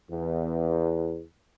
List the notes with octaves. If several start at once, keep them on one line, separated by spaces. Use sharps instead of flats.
E2